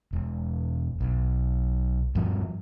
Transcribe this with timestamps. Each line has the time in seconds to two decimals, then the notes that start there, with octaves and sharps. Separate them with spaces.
0.13 E1
1.00 B1
2.15 G2 F3